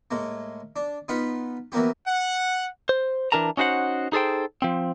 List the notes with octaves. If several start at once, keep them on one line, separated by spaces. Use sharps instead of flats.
A2 G#3 A#3
D4
B3 D#4 F4 F#5 B5
E3 F#3 A#3 B3 G4
F#5
C5
E3 A#3 D4 A#4 A5 A#5
C#4 D#4 F#4 C5 F#5
D#4 G#4 A4 C5 G5
F3 C4